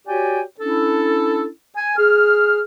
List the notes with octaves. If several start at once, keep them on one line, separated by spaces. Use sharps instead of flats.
F#4 G4 C#5 D5 G5 G#5
C#4 D4 E4 A4
G#5
G#4 F6